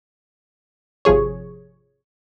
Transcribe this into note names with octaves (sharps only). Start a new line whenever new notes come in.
G#1 C3 F3 G#4 C#5